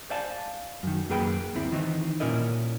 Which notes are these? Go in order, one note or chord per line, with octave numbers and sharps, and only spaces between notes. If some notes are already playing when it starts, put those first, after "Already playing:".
C5 D5 F5 G#5 A5
F#2 D#3
F#2 A#3 G#4 B4 G5 B5
D2 C4 E4
D#3 E3 C4 D#4
A#2 C#4 E4 A#4 D#5